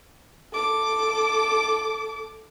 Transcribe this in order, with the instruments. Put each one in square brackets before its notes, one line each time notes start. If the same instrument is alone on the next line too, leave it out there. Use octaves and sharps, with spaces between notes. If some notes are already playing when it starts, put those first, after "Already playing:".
[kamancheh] A4 D6